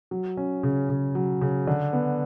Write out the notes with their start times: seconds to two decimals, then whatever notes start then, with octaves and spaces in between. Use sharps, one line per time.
0.11 F#3
0.37 C#4
0.63 C#3
0.89 C#3
1.15 F#3
1.41 C#3
1.67 D3
1.93 B3